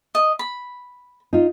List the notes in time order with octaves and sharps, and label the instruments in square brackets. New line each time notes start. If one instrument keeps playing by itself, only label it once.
[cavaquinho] D#5
B5
[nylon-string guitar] D#4 F4